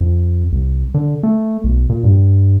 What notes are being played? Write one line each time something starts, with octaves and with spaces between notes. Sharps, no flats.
F2
C2
D3
A3
B1
A#2
G2